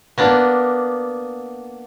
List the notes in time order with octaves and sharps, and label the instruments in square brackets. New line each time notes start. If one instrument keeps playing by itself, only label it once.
[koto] A#3 B3 D4